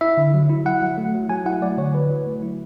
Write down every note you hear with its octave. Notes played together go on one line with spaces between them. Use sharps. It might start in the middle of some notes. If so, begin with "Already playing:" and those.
E4 E5
D3
F#3
E4
E4 F#5
F#3
A3
F#3
F#3 G#5
E4 F#5
A3 D5
D3 C#5
F#3 B4
F#3
A3
E4